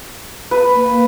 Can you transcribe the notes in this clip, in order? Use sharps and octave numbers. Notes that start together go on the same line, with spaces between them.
B4
A#3